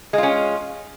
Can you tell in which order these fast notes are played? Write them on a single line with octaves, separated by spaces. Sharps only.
G#3 F4 C#4